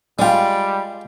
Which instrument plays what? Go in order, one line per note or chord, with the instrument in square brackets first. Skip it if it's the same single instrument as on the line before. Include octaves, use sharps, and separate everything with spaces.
[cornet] G3 [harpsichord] G#3 F4 [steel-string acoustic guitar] D5 G5